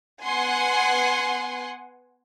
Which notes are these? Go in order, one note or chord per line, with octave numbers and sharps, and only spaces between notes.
B3 F#5 G#5 C6